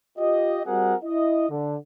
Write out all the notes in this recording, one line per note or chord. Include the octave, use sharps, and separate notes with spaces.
F4 G4 D#5
G3 C4 F#4 G#4 A#4 F#5
E4 D#5
D3